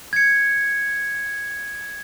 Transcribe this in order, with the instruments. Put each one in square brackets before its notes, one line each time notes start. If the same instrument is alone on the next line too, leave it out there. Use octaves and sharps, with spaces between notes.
[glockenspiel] G#6 C#7